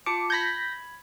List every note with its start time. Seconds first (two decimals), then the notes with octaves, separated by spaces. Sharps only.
0.06 F4 A5 D6 C#7
0.30 B5 G6 G#6 A#6 B6